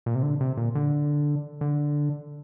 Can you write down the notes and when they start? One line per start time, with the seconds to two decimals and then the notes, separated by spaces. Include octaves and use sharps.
0.06 A#2
0.15 C3
0.23 D3
0.41 C3
0.57 A#2
0.75 D3
1.61 D3